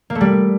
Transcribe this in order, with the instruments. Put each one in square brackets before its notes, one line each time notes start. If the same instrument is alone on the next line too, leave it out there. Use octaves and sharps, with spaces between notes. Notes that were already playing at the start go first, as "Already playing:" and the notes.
[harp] A#3
A3
G3